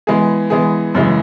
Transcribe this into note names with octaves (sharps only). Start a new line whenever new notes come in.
E3 G#3 B3 G#4
E3 G#3 B3 G#4
F#2 C#3 E3 G#3